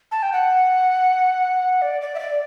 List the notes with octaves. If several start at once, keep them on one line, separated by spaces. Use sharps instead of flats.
A5
G5
F#5
D5
D5
E5
D5